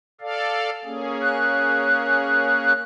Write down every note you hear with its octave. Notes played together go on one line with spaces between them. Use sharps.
A4 D5 F5
A#3 C#4 G#4
F#6